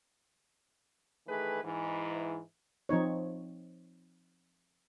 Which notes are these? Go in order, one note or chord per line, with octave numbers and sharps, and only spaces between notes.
D#3 E3 A3 G#4 B4
G#2 E3
F3 C4 D#4 C#5